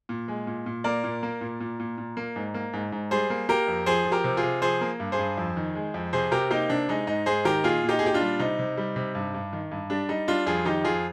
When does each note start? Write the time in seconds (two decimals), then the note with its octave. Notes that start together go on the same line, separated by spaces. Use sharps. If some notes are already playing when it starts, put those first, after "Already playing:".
0.09 A#2
0.28 G#3
0.47 A#2
0.66 A#2
0.84 A#3 A#4 D5
1.04 A#2
1.23 A#3
1.41 A#2
1.60 A#2
1.80 A#2
1.98 A#2
2.17 A#3
2.36 G#2
2.54 A#3
2.73 G#2
2.92 G#2
3.11 G3 G#4 C5
3.30 A#3
3.49 A#3 G4 A#4
3.68 F2
3.86 F3 G#4 C5
4.05 F3
4.12 G4 A#4
4.24 C3
4.37 F4 G#4
4.43 C3
4.62 F3 G#4 C5
4.81 A#3
5.00 G2
5.12 G#4 C5
5.19 G2
5.38 F2
5.57 D#3
5.75 G#3
5.94 F2
6.13 C3 G#4 C5
6.31 C3 G4 A#4
6.51 A#3 D#4 G4
6.69 C3 D4
6.89 G#3 D#4
7.07 G#2 D#4
7.26 G#2 G#4 C5
7.45 D#3 G4 A#4
7.64 A#2 F4 G#4
7.83 A#2
7.89 D#4 G4
7.99 G#4
8.01 A#2 G4
8.14 D4 F4
8.21 G3
8.39 C3 D#4
8.59 C3
8.77 G3
8.96 C3
9.15 G2
9.34 G2
9.53 D#3
9.71 G2
9.90 G3 D4
10.09 G3 D#4
10.28 G3 D4 F4
10.46 F2 F4 G#4
10.66 D#3 D#4 G4
10.84 F2 F4 G#4